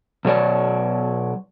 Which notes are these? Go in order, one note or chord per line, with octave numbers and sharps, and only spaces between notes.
B2 F#3 C#5 D5